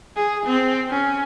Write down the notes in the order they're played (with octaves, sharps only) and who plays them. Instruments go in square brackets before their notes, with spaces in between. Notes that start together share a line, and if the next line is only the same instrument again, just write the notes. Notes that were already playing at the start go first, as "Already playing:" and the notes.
[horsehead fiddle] G#4
C4
C#4